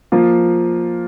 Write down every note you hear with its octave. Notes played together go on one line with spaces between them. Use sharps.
F3 A#3 F4